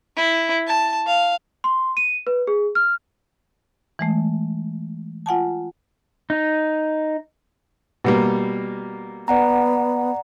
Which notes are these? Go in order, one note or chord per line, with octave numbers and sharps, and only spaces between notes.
E4
A5
F5
C6
D#7
B4
G#4
F6
E3 G#3 A3
F4 F#5 G#5 A5
D#4
B2 G3 A#3
B3 D5 F#5 A#5